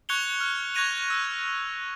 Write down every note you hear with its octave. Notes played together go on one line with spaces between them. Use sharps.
C#6 F#6 G#6 C#7 F7 G7
F6
C#6 F#6 G#6 A#6 D#7 F7
E6